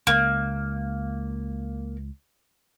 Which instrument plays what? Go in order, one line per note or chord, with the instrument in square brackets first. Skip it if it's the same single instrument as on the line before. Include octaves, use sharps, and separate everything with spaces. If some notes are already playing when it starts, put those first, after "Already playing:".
[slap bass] C#2 [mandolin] A#3